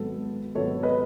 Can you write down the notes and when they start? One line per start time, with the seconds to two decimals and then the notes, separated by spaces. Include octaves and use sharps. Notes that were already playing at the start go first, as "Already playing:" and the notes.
Already playing: G#1 G#2 F#3 B3 A4
0.55 G#1 G#2 F#3 B3 A4 C#5
0.83 B4 D#5